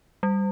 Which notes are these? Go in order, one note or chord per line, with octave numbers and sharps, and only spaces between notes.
G3